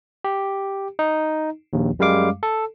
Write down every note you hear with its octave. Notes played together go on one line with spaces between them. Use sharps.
G4
D#4
A#1 D#2
F#2 G3 G#3 F5 D6
A4